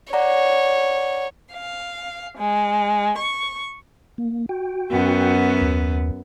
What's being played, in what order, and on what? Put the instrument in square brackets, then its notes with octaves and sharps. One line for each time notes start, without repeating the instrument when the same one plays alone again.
[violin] C#5 [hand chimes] D5 F#5 A#5
[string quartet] F5
G#3
C#6
[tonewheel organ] A#3
F#4 G5
[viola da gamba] F#2 B3
[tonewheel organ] D#2